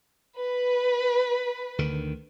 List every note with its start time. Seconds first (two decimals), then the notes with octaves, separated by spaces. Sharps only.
0.38 B4
1.78 D2 D3 D#3